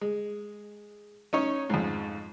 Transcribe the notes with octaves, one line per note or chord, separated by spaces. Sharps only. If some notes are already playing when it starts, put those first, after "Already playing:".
G#3
C#4 D#4 C#5
F2 G#2